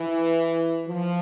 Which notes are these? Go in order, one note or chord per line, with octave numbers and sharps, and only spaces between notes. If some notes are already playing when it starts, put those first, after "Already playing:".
Already playing: E3
F3